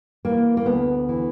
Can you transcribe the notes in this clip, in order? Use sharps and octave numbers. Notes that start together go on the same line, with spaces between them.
E3 A#3
A#3
D2 B3
E3